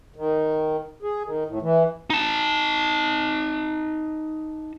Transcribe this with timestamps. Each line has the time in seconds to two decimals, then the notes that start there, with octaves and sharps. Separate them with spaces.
0.16 D#3
1.02 G#4
1.25 D#3
1.47 A2
1.62 E3
2.10 D#4 A5